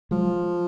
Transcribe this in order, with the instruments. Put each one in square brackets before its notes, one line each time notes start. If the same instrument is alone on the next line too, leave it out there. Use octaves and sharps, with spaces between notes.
[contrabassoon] F3 [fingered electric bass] F#3 G#3